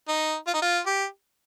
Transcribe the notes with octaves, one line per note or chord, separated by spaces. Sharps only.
D#4
F4
D#4
F4
G4